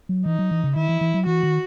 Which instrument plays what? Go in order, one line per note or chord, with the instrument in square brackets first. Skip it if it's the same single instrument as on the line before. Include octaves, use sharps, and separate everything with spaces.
[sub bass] F#3
[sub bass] E3 [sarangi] D#4
[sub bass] F#3
E3
C#3
[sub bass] D#3 [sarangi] E4
[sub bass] E3
E3
F#3
[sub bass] E3 [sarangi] F#4
[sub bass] D#3